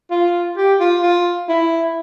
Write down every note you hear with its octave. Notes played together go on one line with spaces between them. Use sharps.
F4
G4
F4
F4
E4